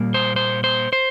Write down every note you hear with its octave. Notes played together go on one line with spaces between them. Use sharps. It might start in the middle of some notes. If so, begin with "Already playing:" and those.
Already playing: A#2 G3 A#3
C5
C5
C5
C5